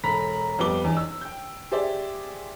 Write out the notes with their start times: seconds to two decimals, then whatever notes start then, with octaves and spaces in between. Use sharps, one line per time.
0.04 E1 A4 A#5 B5 B6
0.59 F2 G3 B3 G5 D6 G7
0.84 E2 D#4
0.97 E6
1.21 G5 G6
1.72 G4 G#4 C5 D5 E5